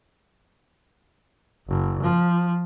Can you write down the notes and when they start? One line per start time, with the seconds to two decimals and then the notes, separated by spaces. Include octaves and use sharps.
1.68 F#1
2.03 F3